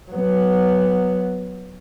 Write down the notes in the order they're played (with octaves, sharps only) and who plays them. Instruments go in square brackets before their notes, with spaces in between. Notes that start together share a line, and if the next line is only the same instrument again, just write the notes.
[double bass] F#3 B3